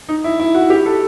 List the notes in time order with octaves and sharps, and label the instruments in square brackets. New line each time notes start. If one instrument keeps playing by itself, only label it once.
[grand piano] D#4
E4
E4
F#4
G4
A4